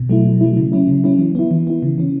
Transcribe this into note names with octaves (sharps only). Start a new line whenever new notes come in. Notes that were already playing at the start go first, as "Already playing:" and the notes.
Already playing: B2
F#3 A3 E4
B2
F#3 A3 E4
C#3
F#3 C#4 E4
C#3
F#3 C#4 E4
E3
B3 E4
E3
B3 E4
C#3
E3 C#4